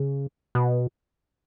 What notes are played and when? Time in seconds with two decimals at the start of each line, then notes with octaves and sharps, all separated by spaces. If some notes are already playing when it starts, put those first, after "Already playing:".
Already playing: C#3
0.55 B2